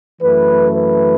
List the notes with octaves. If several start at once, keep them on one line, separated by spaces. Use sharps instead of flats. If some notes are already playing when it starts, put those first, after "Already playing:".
F#2 E3 A3 B4
B4